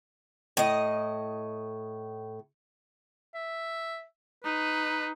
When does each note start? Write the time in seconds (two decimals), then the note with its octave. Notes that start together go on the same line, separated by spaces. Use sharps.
0.57 A2 D#5
3.34 E5
4.44 D#4 B4